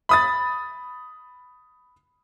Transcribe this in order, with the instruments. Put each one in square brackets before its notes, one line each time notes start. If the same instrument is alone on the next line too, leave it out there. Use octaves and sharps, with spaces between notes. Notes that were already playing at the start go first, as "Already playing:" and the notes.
[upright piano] B5 D#6 A6